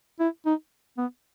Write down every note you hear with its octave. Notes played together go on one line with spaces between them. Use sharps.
E4
D#4
B3